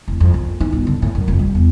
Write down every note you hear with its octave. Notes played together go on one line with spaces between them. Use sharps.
E1
F2
A#1
D#4
G1
D3
A2
F#2
F1
G3
E2